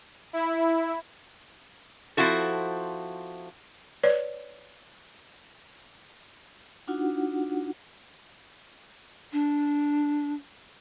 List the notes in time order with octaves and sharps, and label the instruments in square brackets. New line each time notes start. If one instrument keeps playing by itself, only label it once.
[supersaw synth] E4
[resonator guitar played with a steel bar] F3 C4 E4 F#4 A4
[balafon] B4 C#5 D5
[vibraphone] D4 D#4 F4 F#4 F#5
[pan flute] D4